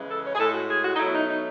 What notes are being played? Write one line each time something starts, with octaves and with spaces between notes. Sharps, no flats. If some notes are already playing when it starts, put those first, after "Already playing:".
Already playing: C#3 E3 G#3
A4
C#5
G#4
A2 G#3 A4
F#4
G#4
F#4
D#4
B2 F#3 A3 E4
D#4
D#4